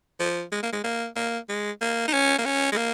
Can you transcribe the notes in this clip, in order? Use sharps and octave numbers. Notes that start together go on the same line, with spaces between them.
F3
G#3
A#3
G#3
A#3
A#3
G#3
A#3
D#4
C#4
A#3
C#4
G#3
A#3